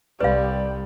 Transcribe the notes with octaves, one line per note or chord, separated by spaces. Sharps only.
C2 G3 B4 D5 F5